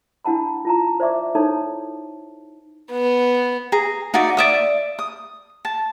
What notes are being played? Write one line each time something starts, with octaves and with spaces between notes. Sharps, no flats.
D4 E4 F#5 A5 B5
F4 A5 A#5
C5 D5 E5 C#6 D6
D#4 E4 A4 C#5 A5
B3
G#4 A#5
D#4 F#4 D5 E5
D5 E5 D#6
D#6
A5